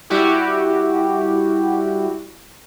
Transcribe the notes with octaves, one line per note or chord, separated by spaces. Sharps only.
G3 E4 F#4 G4